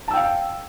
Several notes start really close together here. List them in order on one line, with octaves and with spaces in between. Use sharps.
A5 E6 G5 F5